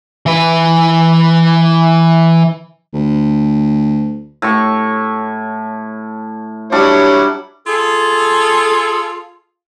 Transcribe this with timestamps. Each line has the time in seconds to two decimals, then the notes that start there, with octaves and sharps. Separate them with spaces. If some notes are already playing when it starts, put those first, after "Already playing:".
0.26 E3 B4
2.94 D2
4.42 A2 C#6
6.72 F#3 G3 D4 E4 C#5
7.66 F4 G#4 A4